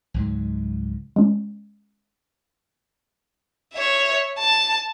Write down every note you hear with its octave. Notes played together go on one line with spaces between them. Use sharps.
C#2 G#2 F#3
G#3 C#4
C#5 E5
A5